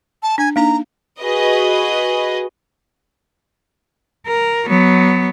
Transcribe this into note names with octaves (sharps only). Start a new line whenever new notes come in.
A5
D4 G#5
A#3 D4 D#4 A#5
F#4 G#4 B4 D#5
A#4
F#3 B3